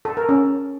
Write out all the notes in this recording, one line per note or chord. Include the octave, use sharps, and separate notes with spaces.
A4
A#4
C#4